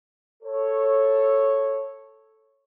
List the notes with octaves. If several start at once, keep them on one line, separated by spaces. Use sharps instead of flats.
A4 C#5